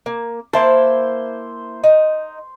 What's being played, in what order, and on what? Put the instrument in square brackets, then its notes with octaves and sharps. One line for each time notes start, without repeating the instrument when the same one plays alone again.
[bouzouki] A#3
[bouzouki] A#3 E4 A5 [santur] C5
[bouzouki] D#4